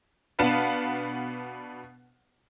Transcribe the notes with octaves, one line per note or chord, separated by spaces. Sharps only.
B2 B3 D4 B4 F5 E7